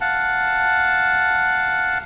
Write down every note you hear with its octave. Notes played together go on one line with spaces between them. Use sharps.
F5 F#5 A5